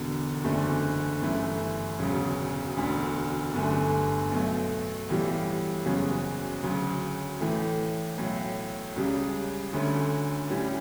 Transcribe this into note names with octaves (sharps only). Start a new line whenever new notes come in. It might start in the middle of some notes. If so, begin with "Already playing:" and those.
Already playing: E1 E2 D3
F#1 E2 D3 A3 D4
G1 F#2 E3 A3 E4
E1 D2 C#3 F#3
E1 D2 D3
G1 F#2 D3 A3
B1 B2 F#3 A3
B1 A2 E3 G3
F#1 E2 C#3 F#3
D2 C#3 F#3
A2 E3 A3
B1 A2 F#3
C#2 C#3 G3
D2 D3 A3 C#4
A2 G3 C#4 E4